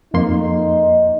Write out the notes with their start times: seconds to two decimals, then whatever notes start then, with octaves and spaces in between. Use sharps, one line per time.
0.14 F2 A#3 D#4 C6